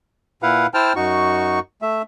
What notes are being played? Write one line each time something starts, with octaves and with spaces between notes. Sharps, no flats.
A#2 E4 B4 F5 F#5
E4 C5 G5 A5 F6
F#2 D#4 F#4 C#6
A3 E5